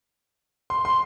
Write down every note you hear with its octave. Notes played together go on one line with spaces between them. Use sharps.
C6
C6